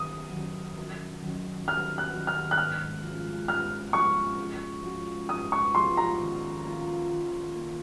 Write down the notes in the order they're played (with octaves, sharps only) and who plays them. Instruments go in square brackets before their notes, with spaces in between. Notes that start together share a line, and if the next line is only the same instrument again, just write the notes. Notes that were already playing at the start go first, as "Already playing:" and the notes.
Already playing: [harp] F#2 D#3 F#3 C#4 [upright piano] D#6
[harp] D#3 F#3 C#4 F#4
F#2
D#3 F#3 C#4 F#4
[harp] F#2 [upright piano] F6
[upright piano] F#6
[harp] D#3 F#3 C#4 F#4
[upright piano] F6
F#6
[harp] G#2 [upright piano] F6
[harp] F3 G#3 C#4 F#4
[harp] G#2 [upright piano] F6
[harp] F3 G#3 C#4 F#4 [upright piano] C#6
[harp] G#2
F3 G#3 C#4 F#4
[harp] G#2 [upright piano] D#6
[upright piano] C#6
[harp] F3 G#3 C#4 F#4 [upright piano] C6
[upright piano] A#5
[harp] D#3
A#3 F4
D#3
A#3 F4